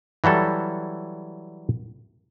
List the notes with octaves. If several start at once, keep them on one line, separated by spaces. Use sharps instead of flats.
E3 F#3 G3 A4